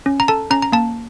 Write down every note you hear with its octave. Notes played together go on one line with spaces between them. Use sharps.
C#4
A#5
A4 A5
C#4 A#5
A#5
A#3 A5